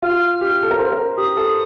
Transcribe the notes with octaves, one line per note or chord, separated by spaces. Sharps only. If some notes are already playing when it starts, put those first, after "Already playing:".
F4 F6
G4
A4
A#4
C5
A#4
G4 D#6
A4